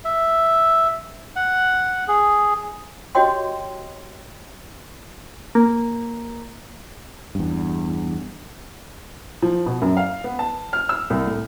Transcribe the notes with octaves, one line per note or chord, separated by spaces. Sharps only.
E5
F#5
G#4
F#4 G4 C#5 D#5 G5 C6
A#3
E2 G2
F3
B2
F#2
F5
B3
A5
F6
E6
C2
A2